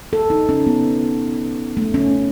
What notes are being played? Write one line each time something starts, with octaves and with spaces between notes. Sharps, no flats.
A4
D#4
C#4
B3
A3
C#4